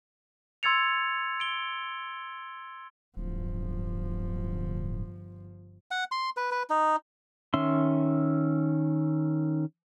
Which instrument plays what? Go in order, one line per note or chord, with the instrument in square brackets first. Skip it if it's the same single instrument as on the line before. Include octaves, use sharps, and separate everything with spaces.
[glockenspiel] C6 E6 G#6 A6 C#7 F7
D7 G7
[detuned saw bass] D1 [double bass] G1 F3
[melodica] F#5
C6
B4
B4
D#4
[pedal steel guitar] D#3 C#4 E5 C6